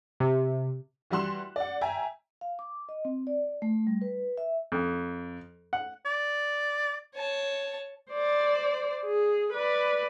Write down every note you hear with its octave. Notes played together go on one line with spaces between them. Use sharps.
C3
E3 G3 F#4 C6 F#6 E7
D5 F#5
E5 G5 G#5 A#5
F5
D6
D#5
C4
D5
A3
G3
B4
E5
F2
F#5
D5
C#5 A5
C5 D5
G#4
B4 D5